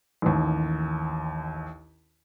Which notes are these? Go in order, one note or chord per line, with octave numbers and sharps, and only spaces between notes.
A1 D#2